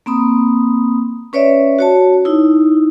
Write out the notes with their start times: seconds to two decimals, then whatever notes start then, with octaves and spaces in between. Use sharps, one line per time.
0.06 A#3 C4 B5 D#6
1.33 C#4 B4 C#5 D5 E5
1.79 F#4 C#5 A5
2.25 D#4 E4